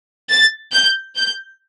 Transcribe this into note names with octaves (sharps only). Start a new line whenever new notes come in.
A6
G6
G6